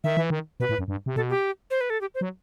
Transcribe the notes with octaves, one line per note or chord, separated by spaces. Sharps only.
D#3 E5
E3
D#3
B2 B4
A2
F#2
G2
C3
B2 A4
G4
C5
B4
A4
G4
C5
F#3